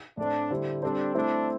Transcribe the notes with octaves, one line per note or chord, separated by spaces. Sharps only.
A2 A3 C4 D4
D3 G3 E4 G4 C5
G3 C4 D4 A4 C5
A3 C4 D4 E4 C5